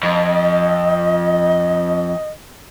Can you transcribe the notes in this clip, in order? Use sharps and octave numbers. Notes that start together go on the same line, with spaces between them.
F2 D#5